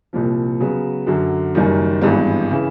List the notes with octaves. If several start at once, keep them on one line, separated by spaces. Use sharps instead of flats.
C2 A#2 F3
C#3 F#3 B3
F#2 D3 F#3
F#1 F#2 D#3 G3
G#1 G2 E3 G#3 B3
C#3 E3